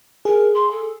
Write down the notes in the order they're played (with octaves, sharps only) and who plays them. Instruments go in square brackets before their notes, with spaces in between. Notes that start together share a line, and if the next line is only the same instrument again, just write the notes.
[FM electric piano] G#4 [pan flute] A#4
[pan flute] C6
A4